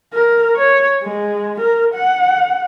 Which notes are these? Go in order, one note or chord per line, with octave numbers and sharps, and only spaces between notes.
A#4
C#5
G#3
A#4
F#5